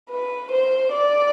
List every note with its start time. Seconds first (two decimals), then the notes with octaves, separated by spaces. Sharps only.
0.11 B4
0.52 C5
0.92 D5